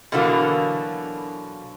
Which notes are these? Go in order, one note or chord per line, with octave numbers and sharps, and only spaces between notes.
B2 D3 E3 F#3 A#3 F#4